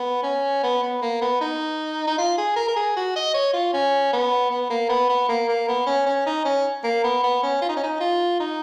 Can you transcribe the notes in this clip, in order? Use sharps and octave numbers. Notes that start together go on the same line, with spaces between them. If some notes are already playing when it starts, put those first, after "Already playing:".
Already playing: B3
C#4
B3
B3
A#3
B3
D#4
D#4
F4
G#4
A#4
A#4
G#4
F#4
D#5
C#5
F4
C#4
B3
B3
A#3
B3
B3
A#3
A#3
B3
C#4
C#4
D#4
C#4
A#3
B3
B3
C#4
F4
D#4
C#4
D#4
F4
D#4